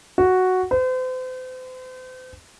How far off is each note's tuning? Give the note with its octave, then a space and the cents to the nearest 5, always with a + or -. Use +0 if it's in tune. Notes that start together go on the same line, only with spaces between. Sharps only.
F#4 +0
C5 -40